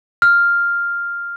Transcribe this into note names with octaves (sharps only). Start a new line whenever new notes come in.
F6